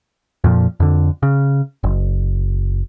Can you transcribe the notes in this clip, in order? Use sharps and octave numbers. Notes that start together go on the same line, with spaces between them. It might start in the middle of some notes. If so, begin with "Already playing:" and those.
F2 A#2 F3
F2 D3
C#3
F#1